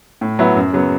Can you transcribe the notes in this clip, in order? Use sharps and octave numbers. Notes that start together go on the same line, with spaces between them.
A2
F#3 B3 E4
F#2
C#3 F#3 B3